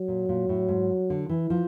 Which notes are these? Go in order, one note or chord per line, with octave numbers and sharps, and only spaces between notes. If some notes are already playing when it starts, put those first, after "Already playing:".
Already playing: F#3
A#2
A#2
A2
G#2
D3
E3
F3